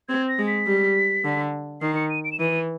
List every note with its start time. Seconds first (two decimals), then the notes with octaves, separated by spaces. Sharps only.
0.09 C4 G#6
0.28 A#6
0.39 G#3
0.47 B6
0.67 G3
1.24 D3
1.81 D#3 C7
1.96 C#7
2.10 D#7
2.24 D7
2.32 E7
2.39 E3 D#7